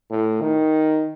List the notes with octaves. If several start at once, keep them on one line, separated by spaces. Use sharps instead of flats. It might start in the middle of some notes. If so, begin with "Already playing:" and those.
A2
D#3